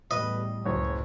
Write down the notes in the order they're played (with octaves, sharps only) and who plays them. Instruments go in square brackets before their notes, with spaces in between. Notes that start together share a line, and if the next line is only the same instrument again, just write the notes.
[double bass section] E2 A2 G3 [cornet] B4 [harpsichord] D#5
[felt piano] F#1 [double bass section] C#2 F#3 [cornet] C#5